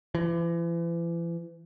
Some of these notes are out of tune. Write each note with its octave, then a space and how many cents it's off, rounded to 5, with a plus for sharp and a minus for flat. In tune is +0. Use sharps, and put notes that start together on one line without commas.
E3 +40